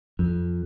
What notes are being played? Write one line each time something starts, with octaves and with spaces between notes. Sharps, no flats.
F2